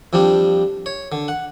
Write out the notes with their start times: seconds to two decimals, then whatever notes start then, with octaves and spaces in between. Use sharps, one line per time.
0.13 F2 F3 G3 D4
0.86 C#5
1.12 D3
1.28 F#5